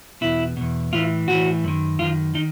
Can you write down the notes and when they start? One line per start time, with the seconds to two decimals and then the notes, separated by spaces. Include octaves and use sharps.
0.21 E2 B2 E4
0.57 E2 B2
0.93 A2 E3 F4
1.28 A2 E3 F#4
1.64 F#2 D#3
1.99 F#2 D#3 F4
2.34 D#3 D#4